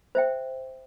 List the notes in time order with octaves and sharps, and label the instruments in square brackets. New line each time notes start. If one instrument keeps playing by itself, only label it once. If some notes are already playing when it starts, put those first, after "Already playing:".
[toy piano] C5 E5 G5